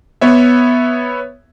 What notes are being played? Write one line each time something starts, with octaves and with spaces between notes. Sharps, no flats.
B3 C#5 E5